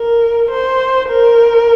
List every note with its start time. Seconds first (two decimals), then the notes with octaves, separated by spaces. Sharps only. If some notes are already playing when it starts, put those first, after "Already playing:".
Already playing: A#4
0.51 C5
1.09 A#4